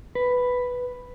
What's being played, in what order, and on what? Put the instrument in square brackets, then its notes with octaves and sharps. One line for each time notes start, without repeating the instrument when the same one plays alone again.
[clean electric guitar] B4